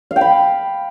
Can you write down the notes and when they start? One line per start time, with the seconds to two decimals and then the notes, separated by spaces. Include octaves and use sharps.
0.11 F5
0.16 G5
0.21 B5